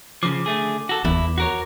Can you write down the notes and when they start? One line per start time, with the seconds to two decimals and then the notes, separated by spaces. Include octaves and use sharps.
0.23 C#3 F3 D6
0.46 D3 A3 G#4
0.89 F#4 A4
1.05 E2 E4
1.38 F#4 A#4 C#5